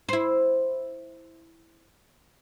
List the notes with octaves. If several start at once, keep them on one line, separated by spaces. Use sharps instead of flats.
E4 C5